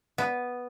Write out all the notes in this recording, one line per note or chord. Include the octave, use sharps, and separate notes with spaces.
B3